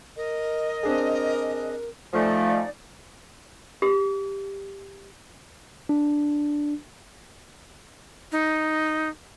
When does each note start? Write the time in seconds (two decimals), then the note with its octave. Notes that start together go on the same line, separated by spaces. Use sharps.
0.17 A#4 D#5
0.83 C4 D4 G#4
2.13 F3 A3 D#4 A4 D5 G#5
3.82 G4
5.89 D4
8.32 D#4